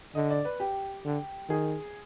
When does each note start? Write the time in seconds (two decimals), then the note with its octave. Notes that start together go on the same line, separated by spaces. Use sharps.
0.15 D3 D#5
0.31 D5
0.45 B4
0.60 G4
1.05 D3
1.49 D#3 G#4